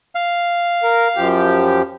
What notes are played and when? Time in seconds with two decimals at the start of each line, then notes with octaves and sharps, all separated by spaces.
0.15 F5
0.83 A#4
1.16 F#2 F3 G4